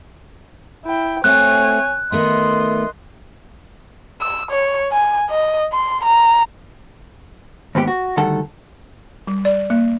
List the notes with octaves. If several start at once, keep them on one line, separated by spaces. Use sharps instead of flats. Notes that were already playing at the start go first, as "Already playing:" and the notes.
E4 G5
A3 C4 F#4 C#5 G#5 F#6
D#3 A3 B3 D#5 C6
E6
C#5
G#5
D#5
C6
A#5
D#2 G#2 B3 G4
F#4
D2 D#3 G3 A4 F#5
G3
D5
A#3